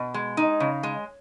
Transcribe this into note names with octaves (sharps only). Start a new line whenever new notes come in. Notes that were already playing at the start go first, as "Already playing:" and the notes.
Already playing: B2
G#3
D#4
C#3
G#3